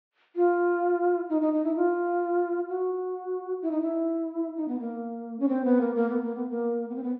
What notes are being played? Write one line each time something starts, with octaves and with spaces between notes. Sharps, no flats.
F4
D#4
D#4
D#4
E4
F4
F#4
E4
D#4
E4
D#4
B3
A#3
C#4
C4
B3
A#3
A#3
B3
A#3
B3
A#3
B3
C4
B3